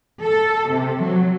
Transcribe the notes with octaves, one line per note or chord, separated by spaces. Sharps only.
A4
C3
F#3